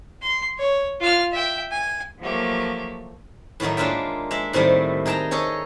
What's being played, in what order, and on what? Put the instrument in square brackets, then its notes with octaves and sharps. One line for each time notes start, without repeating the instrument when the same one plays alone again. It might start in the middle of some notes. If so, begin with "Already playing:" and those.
[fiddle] C6
C#5
F4 F6
E5 G5
G#5
[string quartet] F3 F#3 A3 A#3 G4 E5
[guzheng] A2 D#3 F#3 A3 D#4
G#3 A#3 D4 F4 E5 G5
G#3 G4 E5
A2 C3 D#3 G3 A3
D#4 G#4 G5 A5 A#5
C#4 G#4 A4 C#5 D#5